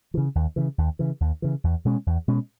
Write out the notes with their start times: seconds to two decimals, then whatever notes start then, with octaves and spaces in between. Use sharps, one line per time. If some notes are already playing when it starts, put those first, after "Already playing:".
0.14 C#3 E3
0.35 D#2
0.56 C#3 E3
0.78 D#2
0.99 C#3 E3
1.21 D#2
1.42 C#3 E3
1.64 E2
1.85 B2 G#3 C#4
2.07 E2
2.28 B2 G#3 C#4